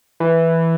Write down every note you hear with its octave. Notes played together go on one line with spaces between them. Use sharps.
E3